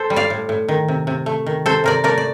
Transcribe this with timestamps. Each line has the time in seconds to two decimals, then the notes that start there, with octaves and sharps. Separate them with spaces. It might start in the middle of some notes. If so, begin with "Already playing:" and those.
Already playing: A4 C5
0.10 G3
0.16 D5 F5
0.30 A2
0.49 A2
0.68 D#3
0.88 C3
1.07 C3
1.26 A3
1.46 D#3
1.66 C3 A4 C5
1.84 C3 A#4 D5
2.04 A3 A#4 D5
2.18 D5